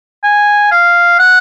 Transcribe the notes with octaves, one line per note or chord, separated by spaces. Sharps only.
G#5
F5
F#5